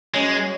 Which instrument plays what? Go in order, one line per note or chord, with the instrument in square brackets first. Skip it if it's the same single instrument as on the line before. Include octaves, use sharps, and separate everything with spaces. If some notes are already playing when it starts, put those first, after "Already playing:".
[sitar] F#2 [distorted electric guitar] G#3